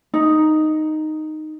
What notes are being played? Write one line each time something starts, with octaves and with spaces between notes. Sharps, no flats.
D#4